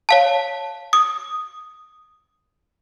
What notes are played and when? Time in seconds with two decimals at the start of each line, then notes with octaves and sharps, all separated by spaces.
0.09 C#5 F5 A5
0.93 D#6